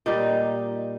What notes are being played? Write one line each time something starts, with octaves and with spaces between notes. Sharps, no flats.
A#2 G3 D#4